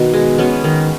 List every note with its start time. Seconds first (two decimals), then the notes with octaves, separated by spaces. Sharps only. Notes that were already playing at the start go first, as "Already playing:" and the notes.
Already playing: B2 D#3 B3 D#4
0.13 G#3
0.38 B3 C#4
0.64 D#3